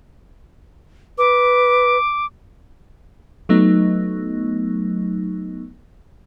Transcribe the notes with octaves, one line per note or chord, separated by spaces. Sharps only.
B4 D6
F#3 A3 B3 D#4